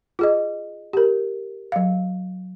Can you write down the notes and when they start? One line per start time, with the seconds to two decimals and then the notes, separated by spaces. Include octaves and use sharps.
0.19 F4 G#4 D#5
0.93 G4 A#4
1.72 F#3 F5